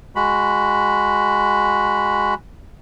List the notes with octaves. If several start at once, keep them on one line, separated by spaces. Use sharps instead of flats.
G#3 F#4 B5